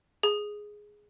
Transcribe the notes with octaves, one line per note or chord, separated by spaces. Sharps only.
G#4